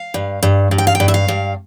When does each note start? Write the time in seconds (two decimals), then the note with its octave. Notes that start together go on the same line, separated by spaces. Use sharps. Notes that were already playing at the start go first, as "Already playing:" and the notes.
Already playing: F5
0.14 G2
0.43 G2
0.71 G2
0.78 G5
0.87 F5
0.95 G5
1.00 G2
1.08 E5
1.14 F5
1.28 G2